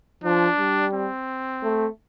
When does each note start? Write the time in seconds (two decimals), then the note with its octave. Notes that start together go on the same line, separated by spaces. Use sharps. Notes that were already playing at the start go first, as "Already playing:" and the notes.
0.24 F3 D4
0.59 G3
0.93 C4
1.63 A3